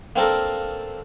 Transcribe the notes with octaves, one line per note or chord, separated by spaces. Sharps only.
A#3 C4 D4 A4 A#4